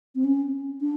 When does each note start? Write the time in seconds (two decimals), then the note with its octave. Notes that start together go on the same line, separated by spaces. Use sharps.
0.15 C4
0.24 C#4
0.81 D4